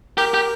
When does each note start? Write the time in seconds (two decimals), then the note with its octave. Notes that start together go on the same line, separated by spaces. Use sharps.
0.18 G4 A#4
0.34 G4